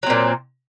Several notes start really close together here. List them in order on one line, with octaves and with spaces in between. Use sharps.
F#3 C4 A#2